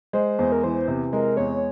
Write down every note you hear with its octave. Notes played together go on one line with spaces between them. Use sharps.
G#3 C5
E2 C5
A#4
E3 C5
C3
G#3 A#4
E2 C#5